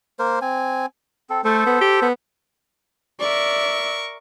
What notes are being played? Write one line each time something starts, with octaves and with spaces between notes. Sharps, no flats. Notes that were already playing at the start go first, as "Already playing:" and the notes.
A#3 A#4 C5
C4 G#5
C4 A4
A3 A4 C5
B3
G4
B3
A#4 D5 E5 C#6